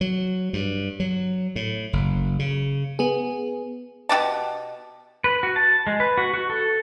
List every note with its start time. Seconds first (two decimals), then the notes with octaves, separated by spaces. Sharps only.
0.01 F#3
0.53 G2
1.00 F#3
1.56 A2
1.93 F#1
2.39 C#3
2.99 B3 G#4
4.09 B2 D#4 G4 A5
5.24 B4
5.43 F#4
5.56 A5
5.87 G#3
6.00 B4
6.18 F#4
6.34 F#4
6.50 A4